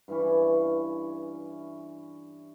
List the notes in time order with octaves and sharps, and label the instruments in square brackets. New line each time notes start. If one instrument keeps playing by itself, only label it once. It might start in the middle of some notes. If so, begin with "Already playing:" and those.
[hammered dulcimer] G2 E3 C#4